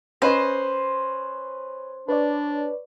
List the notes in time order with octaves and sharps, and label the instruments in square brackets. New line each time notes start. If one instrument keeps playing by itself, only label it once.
[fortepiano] C#4 B4 D#5 [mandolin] C5
[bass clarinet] D4 [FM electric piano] B4 C#5 D5